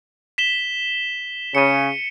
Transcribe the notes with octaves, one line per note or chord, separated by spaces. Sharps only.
B6 E7 G7
C#3 C#7 D#7